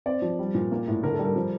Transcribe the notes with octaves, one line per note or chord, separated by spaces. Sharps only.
C4 D5
F3
G3
A#2
A#3
A2
D3 A#4
G3 A4
A#4
F3